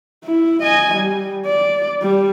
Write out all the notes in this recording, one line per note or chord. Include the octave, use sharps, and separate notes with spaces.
E4
D#5 G#5
G3
D5
G3